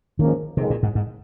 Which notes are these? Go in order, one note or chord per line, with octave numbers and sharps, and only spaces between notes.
G#2 D#3 F3 A#3 C#4
F2 C3 D#3 G#3
A#2
G#2
G#2